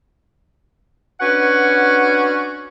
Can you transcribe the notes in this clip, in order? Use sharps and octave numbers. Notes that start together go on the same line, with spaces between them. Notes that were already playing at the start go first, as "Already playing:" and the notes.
C#4 D4 F#4 B4 F#5